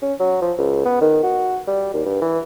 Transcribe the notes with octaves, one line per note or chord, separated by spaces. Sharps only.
C#4
F#3
F3
C#2
B3
D#3
F#4
G3
D#2
G2
E3